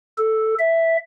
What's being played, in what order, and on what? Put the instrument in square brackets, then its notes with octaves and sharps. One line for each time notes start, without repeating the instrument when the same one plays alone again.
[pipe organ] A4
E5